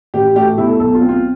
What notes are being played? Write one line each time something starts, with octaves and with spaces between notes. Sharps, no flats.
A1 G4
A3 G4
G4
B2 E4
A4
B1 A4
F4
C4
F4